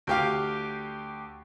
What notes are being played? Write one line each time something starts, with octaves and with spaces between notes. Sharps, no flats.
D2 G4 F5